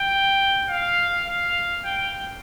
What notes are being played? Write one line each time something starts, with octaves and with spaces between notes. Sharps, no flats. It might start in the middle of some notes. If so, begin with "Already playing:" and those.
Already playing: G5
F5
F5
G5